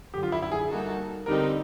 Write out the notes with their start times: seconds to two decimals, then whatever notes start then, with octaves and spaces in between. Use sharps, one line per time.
0.13 F#2 D3 F3 G4
0.23 F4
0.32 E4
0.42 E4
0.52 G#4
0.70 G3 A#3 D#4 F#4 A4
1.26 D3 G3 C4 D#4 G4 A#4